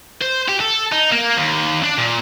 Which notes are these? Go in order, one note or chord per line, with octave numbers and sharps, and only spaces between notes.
C5
G4
A4
D#4
A#3
D#2
D4
A#2